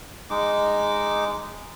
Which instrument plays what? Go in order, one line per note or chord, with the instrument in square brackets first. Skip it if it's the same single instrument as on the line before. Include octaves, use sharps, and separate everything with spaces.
[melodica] G#3 D#4 D6